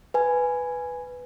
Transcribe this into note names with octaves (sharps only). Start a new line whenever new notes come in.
B4 G#5